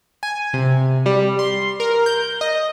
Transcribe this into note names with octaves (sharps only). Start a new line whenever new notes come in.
G#5
C3
G3
C6
A#4
G6
D#5